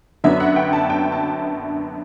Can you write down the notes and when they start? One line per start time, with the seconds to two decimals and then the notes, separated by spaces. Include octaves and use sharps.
0.24 F#2 D3 F#3 B3 D4 E5
0.40 F#5
0.56 G5
0.73 A5
0.90 G5
1.12 A5